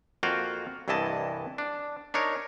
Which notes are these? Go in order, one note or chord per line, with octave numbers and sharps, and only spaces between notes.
F2 A#3 F4 F#4 F5 G5
C2 G2 E3 E4 D#5 A5
D4
D4 D#4 A#4 C#5